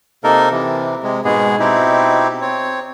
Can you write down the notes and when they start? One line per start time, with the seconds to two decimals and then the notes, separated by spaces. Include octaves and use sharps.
0.24 C3 A#3 D#4 A4 A#4
0.52 C3 E3
1.03 C3 G#3
1.25 G#2 B2 G#3 B3 G#4
1.60 B2 C4 D#4 E4 G4
2.41 C4 C#5